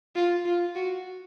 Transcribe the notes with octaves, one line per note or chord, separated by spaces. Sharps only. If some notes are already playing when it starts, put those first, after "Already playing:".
F4
F4
F#4